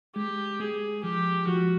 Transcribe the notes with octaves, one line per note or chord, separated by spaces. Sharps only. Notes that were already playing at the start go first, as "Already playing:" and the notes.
G#3 G4
G#3 G#4
F3 G4
F3 F#4